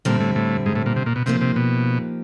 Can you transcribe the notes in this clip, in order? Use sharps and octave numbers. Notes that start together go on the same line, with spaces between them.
A#2 D3 G3 C4 E4
A2
A2
G#2
A2
A#2
C3
A#2
B2
C3 F3 A#3 D#4 G4
C3
B2